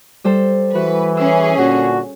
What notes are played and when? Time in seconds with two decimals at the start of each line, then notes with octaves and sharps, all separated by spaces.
0.24 G3 A4 C5
0.75 E3 F#4 B4
1.17 C#4 G#4 E6
1.58 A#2 D3 F#4